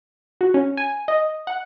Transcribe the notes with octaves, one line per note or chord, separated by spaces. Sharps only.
F#4
C#4
G#5
D#5
F#5